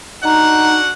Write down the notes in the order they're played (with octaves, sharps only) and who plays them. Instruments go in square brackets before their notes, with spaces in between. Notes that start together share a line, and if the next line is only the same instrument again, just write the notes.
[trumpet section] D4 F#4 F#5 [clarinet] D#4 [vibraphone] D#5 A#5